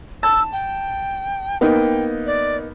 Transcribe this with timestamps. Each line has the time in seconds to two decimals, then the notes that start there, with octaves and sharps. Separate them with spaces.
0.23 A5 E6
0.53 G5
1.61 A#3 B3 D#4 G5
2.26 D5